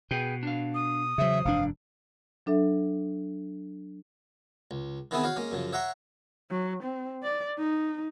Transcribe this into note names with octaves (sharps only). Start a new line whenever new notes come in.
B2 G#4 B4 G5
D4 F5
D#6
E2 C#3 F#3 C5 E5
F1 G2 D4 F5
F#3 D4 A4 E5
C#2
D#3 E3 B3 C4 E4 G#4
F#4 C#5 F5
G#3 A#3 C#4
F#2 C#3 F3
C#5 E5 F#5 A#5 C6 C#6
F#3
C4
D5
D#4